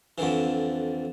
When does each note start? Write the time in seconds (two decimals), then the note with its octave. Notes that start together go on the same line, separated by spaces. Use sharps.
0.18 F2 D3 E3